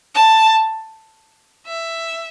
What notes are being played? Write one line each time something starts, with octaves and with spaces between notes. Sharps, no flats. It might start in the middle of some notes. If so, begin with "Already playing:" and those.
A5
E5